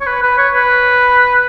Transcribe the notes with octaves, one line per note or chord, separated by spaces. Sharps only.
C#5
B4
B4
C#5
B4